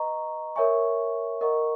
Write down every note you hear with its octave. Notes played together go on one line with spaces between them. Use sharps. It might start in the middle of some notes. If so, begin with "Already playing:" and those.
Already playing: B4 D#5 A#5 C#6
A#4 C#5 E5 G#5 C#6
A#4 D#5 F#5 A#5 C#6